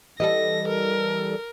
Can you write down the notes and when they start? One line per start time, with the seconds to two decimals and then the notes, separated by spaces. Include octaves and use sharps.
0.20 E3 G3 A4 D#5 A#6
0.68 A#4